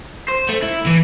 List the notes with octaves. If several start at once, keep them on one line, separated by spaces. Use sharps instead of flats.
C5
A3
E4
E3